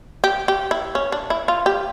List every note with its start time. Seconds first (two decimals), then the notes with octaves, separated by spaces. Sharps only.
0.24 G4
0.48 G4
0.71 E4
0.95 C#4
1.12 D4
1.30 E4
1.48 F4
1.66 G4